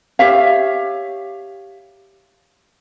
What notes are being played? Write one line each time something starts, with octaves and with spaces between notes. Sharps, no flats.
G4 C#5 E5 F5